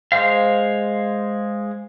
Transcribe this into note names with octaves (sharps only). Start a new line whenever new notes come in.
G#3 C5 F5